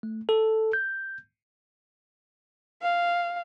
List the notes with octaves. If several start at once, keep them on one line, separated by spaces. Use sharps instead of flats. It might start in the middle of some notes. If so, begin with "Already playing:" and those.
A3
A4
G6
F5